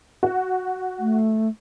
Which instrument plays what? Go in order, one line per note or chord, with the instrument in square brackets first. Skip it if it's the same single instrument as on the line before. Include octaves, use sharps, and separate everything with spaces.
[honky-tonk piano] F#4
[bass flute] A3